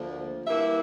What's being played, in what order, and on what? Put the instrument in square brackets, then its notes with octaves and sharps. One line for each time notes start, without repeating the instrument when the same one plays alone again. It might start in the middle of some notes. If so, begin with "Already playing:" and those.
Already playing: [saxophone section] D2 D3 F3 A#3
G2 E3 A#3 E4 E5